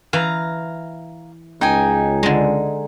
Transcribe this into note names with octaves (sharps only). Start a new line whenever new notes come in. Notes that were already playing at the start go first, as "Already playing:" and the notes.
E3 F5 A#5
C#2 D#4 G5 G#5
D3 G#3